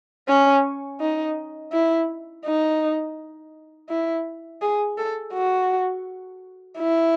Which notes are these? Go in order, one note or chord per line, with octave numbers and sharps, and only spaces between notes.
C#4
D#4
E4
D#4
E4
G#4
A4
F#4
E4